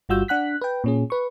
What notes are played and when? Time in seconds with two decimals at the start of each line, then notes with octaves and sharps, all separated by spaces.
0.09 G1 G3 F4 F#4 E6 G6
0.28 D4 F#5 F#6 B6
0.61 B4 G5
0.84 A#2 C#4 G#4
1.10 B4 C#6